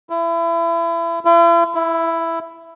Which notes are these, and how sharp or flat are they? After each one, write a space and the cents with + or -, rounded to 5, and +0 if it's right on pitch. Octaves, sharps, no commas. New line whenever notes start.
E4 +30
E4 +45
E4 +5